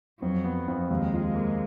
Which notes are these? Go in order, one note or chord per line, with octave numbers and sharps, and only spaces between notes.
F2 F#3
B3
F2
D#2 G#3
F4
A#3